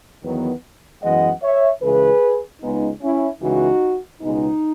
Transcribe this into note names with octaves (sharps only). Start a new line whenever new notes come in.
E2 D#3 F#3 B3
F#2 E3 G#3 B3 D#5 F#5
C#5 E5
C#2 C#3 E3 G#4 B4
C#2 C#3 G#3 B3 D#4
C#4 E4
C#2 C#3 E3 D#4 F#4
C#2 B2 G#3 B3 D#4